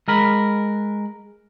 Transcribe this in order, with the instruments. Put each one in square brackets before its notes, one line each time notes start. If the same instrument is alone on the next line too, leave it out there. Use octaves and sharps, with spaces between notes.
[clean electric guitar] G#3 A#4 B5